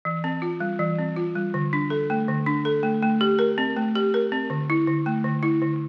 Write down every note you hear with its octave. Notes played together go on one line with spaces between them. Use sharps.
E3
C4
F4
G3
E3
C4
F4
G3
D3
D4
A4
A3
D3
D4
A4
A3
A3
G4
A#4
C4
A3
G4
A#4
C4
D3
E4
D3
A3
D3
E4
D3